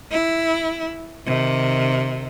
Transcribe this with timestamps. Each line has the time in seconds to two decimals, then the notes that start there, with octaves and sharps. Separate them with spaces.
0.11 E4
1.26 C3 D#3